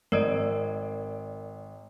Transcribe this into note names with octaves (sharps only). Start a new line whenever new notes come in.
G#1 A#4 D5 D#5 E6 D7